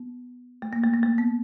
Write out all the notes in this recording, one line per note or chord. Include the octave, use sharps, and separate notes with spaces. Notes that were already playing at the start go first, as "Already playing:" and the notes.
Already playing: B3
A3
A#3
A3
A#3
A3
B3